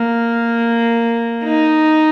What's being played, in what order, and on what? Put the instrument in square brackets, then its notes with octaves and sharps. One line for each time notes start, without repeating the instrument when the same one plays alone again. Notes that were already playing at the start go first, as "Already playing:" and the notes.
Already playing: [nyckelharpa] A#3
D#4